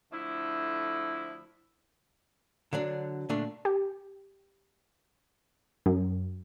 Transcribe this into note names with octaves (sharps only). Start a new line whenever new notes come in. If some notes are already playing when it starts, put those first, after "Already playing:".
D3 F3 A3 E4
D3 F#3 D4
A#2 D3 A3 D4
G4
F#2